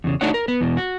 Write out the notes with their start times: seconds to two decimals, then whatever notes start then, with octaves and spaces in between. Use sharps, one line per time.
0.04 E2 C#3
0.21 A3 D4 D#4 F#4 C#5 F#5
0.34 A#4
0.48 B3
0.61 E2 B2
0.77 F#4